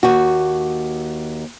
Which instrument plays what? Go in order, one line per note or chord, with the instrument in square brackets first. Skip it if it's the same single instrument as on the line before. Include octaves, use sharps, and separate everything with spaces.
[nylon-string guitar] D#2 F#4